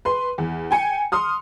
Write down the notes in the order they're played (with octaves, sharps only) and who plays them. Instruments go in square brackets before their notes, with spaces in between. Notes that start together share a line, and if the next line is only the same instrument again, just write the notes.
[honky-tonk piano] B4 C6
E2
G5 G#5 C#7
C6 D#6 F6